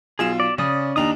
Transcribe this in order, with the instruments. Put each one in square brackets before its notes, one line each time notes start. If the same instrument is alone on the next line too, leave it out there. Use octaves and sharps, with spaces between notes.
[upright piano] B1 F4 E7 [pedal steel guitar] G#4
[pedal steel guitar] D5
[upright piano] C#3 [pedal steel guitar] C#4 D5 D#6
[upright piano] D#2 D4 D#4 [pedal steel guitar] A#5 D#6